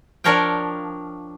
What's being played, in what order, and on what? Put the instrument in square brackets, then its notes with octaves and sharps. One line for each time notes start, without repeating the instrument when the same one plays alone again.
[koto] F3 D4 A#4 C#5 F5 G5